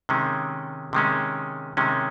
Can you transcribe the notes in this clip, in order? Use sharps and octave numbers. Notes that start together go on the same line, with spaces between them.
C3 D#3 G#3 C#4
C3 D#3 G#3 C#4
C3 D#3 G#3 C#4